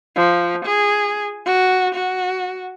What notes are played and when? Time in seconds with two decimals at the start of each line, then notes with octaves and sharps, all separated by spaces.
0.16 F3
0.65 G#4
1.46 F#4
1.94 F#4